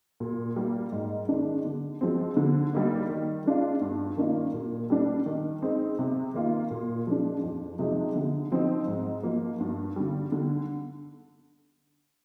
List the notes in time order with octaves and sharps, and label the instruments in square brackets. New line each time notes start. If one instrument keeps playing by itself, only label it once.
[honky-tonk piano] A#2
G3 A#3
G#2
D#3 G#3 D4
D3
F3 G#3 C4
D3
G3 A#3 D#4
D#3
G#3 D4 F4
G2
D#3 A#3 D4 F4
A#2
G3 A#3 D4
D#3
G#3 C4 D#4
C3
D#3 A#3 F4
A#2
F3 G#3 D4
F2
C3 F3 G#3 D#4
D3
F3 C4 D#4
G#2
F3 A#3
G2
D3 G3
D3